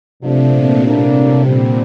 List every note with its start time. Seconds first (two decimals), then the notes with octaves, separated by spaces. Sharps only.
0.20 G2 C3 F3 A3 D4
0.52 A#2
0.83 A2 C3 G3 A#3 D4
1.14 C3
1.45 A#2 D3 G3 C4